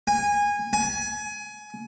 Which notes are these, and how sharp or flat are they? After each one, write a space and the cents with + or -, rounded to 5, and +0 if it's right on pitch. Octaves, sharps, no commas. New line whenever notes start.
G#5 -20
G#5 +20